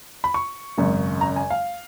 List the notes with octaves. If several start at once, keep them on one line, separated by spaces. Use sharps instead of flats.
B5
C#6
G#1 F#2 C#3
A#5
G#5
F5